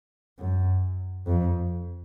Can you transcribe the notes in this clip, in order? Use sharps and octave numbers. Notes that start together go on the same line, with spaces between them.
F#2
F2